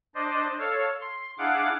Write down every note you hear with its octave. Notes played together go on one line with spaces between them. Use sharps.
D4 C5 D5 D#5
A4 C#5 F5
C6
D4 E4 G#4 F5 F#5 D6